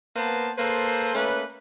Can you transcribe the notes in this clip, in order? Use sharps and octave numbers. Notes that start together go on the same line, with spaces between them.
A#3 B3 B4 C5 A5
A#3 A4 B4 C5
A3 A#3 C#4 B4